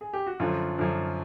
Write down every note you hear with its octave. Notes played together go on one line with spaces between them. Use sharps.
G#4
G4
F#4
F#2 D3 F3 F4
F#2 D3 F3